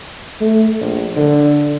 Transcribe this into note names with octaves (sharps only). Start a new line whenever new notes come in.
A3
A#1
D3